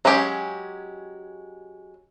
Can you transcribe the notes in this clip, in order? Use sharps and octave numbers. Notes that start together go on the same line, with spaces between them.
F#3 G#3 C#4 G4 C#5